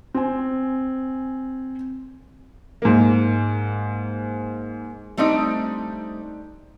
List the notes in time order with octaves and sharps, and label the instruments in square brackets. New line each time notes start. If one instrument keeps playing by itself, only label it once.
[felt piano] C4 G#5
[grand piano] G#2 A#3
[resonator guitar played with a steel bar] G3 A3 C4 D4 D#4